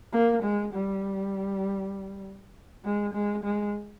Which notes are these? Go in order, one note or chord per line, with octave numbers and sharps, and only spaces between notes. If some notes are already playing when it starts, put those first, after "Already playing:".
A#3
G#3
G3
G#3
G#3
G#3